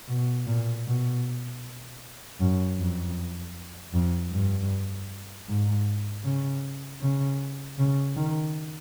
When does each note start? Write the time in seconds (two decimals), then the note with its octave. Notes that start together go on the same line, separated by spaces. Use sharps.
0.08 B2
0.47 A#2
0.86 B2
2.40 F#2
2.78 F2
3.94 F2
4.32 G2
5.47 G#2
6.24 C#3
7.01 C#3
7.79 C#3
8.16 D#3